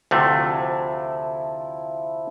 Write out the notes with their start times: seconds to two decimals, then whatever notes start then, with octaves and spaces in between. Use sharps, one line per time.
0.11 D2 C3 F3 A3 E4